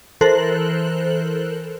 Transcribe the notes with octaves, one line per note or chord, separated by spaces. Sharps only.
E3 A4 A#4 C5 F#6 F#7